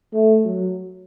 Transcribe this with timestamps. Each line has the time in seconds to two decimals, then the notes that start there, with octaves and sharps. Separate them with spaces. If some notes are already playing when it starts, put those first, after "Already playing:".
0.13 A3
0.45 F#3